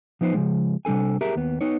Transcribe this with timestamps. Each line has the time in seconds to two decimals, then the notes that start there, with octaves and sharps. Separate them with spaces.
0.21 F3 B3 D#4 C5
0.34 C#3 F3 G#3
0.85 C3 G3 D4 A4 G#5
1.21 G4 G#4 A#4 E5
1.36 D#2 B3
1.61 B3 D#4 C#5